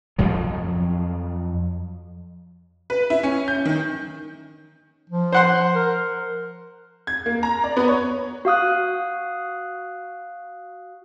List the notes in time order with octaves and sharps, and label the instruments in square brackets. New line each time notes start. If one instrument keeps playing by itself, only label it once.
[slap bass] F2 F3 F#3
[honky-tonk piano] B4
E4
C#4
G6
D#3
[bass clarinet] F3
[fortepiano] C5 F#5 C6
[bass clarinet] A#4
[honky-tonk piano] G#6
A#3
A#5
D5
B3
C#5
[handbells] F#4 F5 D#6 F#6